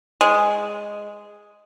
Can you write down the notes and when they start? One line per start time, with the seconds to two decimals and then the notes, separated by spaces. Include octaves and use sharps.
0.21 G#3